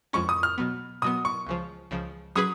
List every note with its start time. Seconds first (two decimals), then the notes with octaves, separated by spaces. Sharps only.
0.13 F2 F3 G#3 C#4 C#6
0.29 D#6
0.43 F6
0.58 B2 F#3 B3
1.02 B2 F#3 B3 D#6
1.25 C#6
1.47 C#2 C#3 F3
1.91 C#2 C#3 F3
2.36 F#3 C#4 G#4 B4 D#6